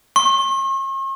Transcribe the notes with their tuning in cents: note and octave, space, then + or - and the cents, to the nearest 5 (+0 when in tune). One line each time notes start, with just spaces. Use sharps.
C#6 -45